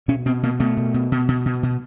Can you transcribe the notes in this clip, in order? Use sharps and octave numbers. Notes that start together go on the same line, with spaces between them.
B2 C#4
B2 C4
B2 A#3
B2 A3
B2
B2
B2
B2
B2
B2